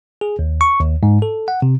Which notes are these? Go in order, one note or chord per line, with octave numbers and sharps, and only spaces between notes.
G#4
D#2
C#6
D#2
G#2
A4
F#5
C3